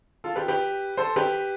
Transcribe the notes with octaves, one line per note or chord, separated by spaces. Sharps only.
F4 A4
G4 B4
G4 B4
A4 C5
G4 B4